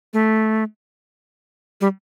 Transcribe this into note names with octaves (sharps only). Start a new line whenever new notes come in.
A3
G3